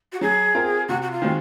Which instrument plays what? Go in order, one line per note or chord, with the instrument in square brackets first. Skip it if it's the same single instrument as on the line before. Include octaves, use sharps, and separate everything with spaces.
[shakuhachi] F#4
[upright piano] F#3 [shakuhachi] G#4
[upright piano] C4 F4 A#4
[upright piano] C3 [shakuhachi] F#4
[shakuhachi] F#4
F4
[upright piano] D#3 G#3 C4 F#4